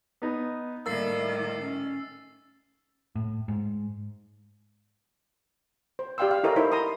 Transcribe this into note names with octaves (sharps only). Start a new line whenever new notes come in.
B3 D#4
A2 D#3 G3 A#3 E6 A6 C7
C#4
A2
G#2
C5
G4 D5 F5 G5 C6 E6
F5 E6
E4 A4 A#4 C#5 D#5
D#4 E4 C5 C#5
A#5 C6 D#6